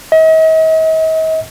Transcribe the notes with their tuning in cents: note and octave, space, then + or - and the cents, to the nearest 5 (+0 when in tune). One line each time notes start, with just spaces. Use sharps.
D#5 +45